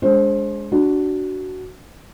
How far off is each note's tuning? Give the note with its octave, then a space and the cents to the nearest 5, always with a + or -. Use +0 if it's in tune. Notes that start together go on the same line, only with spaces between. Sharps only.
G#3 +0 D4 -35 C5 +25
D4 +0 F#4 +10